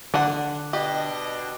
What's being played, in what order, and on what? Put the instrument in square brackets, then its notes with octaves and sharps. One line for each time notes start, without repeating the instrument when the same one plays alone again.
[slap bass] D3 [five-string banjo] D4 F#5
[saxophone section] B2 D4 [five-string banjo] G4 [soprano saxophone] D#5